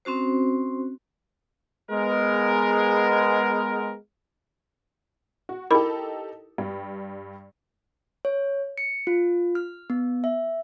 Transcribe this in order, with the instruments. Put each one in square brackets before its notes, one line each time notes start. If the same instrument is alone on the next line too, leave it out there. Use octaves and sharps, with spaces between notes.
[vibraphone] C4 C#4 F#4 C5
[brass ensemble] G#3 B3 A#4
[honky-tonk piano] F#4
[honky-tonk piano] D#4 G4 A4 [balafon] E4 A#4 B5
[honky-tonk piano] G2 G3
[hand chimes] C#5
C#7
F4
F6
B3
E5